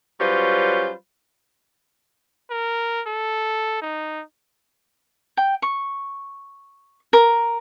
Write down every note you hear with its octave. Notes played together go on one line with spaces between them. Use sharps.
F#3 G3 C#4 F4 B4 C5
A#4
A4
D#4
G5
C#6
A#4